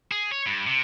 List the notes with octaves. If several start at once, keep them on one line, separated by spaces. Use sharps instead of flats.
G#4
C#5
G2
C3